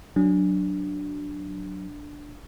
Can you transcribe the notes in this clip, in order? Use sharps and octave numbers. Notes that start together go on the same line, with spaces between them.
F#3 D4